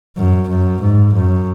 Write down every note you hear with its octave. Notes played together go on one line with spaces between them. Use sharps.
F#2
F#2
G#2
F#2